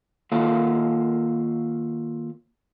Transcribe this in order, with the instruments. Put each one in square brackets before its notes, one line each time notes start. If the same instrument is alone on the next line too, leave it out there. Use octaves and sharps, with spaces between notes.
[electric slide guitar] D#3 A#3 F4 A4 C#5 F5